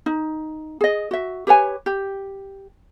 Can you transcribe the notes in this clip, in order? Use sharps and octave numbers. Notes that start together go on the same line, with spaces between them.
D#4
G#4 D#5
F#4 E5
G4 B4 C#5 G#5
G4